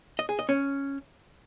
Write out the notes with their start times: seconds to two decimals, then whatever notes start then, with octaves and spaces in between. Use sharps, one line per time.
0.19 D#5
0.29 G#4
0.39 D#5
0.49 C#4